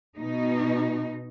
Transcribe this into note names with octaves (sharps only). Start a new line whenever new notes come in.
B2 D#4